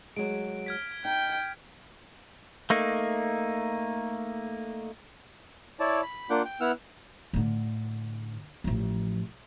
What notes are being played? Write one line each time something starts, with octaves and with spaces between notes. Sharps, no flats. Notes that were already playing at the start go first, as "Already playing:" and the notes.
F#3 G#3 D7
F6 G#6 B6
D#4 G5
A3 A#3 D#4
E4 C#5 D5 A5
B5
A#3 D4 F4 F#5 D6 G6
G5
B3 E4 F#5 E6 F6
A2 D3
A1 F3